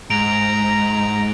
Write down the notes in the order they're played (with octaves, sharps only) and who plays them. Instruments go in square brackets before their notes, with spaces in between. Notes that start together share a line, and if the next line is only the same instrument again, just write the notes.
[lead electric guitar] G#2 [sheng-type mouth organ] A#5 [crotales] D7 F7